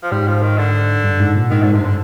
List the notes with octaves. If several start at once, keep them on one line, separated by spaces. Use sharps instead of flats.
F3
G#2 G3
F3
D#3
D3
G2
G#2
A#2
G#2 D#3
G#2 D3
G2 C3
D3